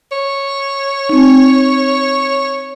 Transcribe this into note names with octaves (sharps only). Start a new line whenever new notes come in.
C#5
C4 D#4